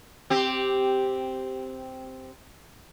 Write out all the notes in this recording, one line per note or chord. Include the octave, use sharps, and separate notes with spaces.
C4 G4